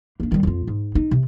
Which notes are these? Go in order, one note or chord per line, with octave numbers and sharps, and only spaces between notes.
A#3 D4
D#3 G3
F2 F4
G#2
D#4
C3